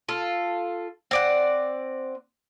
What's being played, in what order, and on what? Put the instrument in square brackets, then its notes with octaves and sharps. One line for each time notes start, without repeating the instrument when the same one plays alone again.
[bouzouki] F4 A4
C4 D5 F#5